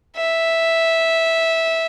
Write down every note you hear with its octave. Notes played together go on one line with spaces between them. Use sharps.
E5